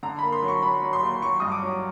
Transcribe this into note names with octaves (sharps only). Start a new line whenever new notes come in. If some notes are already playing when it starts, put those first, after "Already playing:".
D3 A#5
A#3 B5
C6
F#3
C#6
F#3 B5
F#3
C6
D#2
F#3 C#6
G2 D#6
D6
F#3